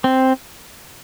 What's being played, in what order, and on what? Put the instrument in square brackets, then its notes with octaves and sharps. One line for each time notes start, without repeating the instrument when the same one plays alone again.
[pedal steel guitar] C4